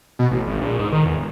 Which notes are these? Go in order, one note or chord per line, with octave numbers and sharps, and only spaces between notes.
B2
A1
G#1
A#1
G#2
D#3
E2
E1